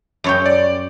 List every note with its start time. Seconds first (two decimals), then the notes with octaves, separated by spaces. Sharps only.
0.24 F#2 C#5 G5
0.46 D5